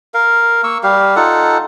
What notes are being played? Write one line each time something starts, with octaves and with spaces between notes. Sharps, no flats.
A#4 F5
A#3 C#6 E6
G3 G4 F5
D#4 F4 A4 F#5